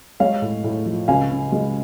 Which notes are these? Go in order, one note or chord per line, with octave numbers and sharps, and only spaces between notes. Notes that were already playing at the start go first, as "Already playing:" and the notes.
G#3 C#5 F5
A2
A2
F3
C#2 F5 G#5
C#3
G#3